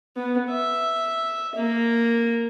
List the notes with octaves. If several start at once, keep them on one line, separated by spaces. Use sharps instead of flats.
B3
E5
A#3